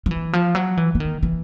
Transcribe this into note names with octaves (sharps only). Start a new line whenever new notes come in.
F3
E3
F3
F#3
E3
E3
D#3
E3